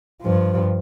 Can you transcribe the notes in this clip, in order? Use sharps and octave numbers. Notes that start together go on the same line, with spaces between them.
G2 F3